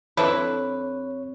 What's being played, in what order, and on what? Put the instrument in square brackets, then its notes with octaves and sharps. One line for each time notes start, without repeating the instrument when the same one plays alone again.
[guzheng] F2 [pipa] D4 E4 B4 [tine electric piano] C#5